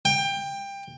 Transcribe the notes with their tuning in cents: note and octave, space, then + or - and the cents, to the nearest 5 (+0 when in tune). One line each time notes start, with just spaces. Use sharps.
G5 +20